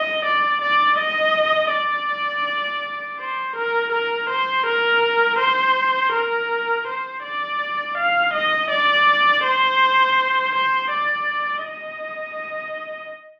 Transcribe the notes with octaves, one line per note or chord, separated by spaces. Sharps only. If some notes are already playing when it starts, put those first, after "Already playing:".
Already playing: D#5
D5
D5
D#5
D5
C5
A#4
A#4
C5
A#4
C5
A#4
C5
D5
F5
D#5
D5
C5
C5
D5
D#5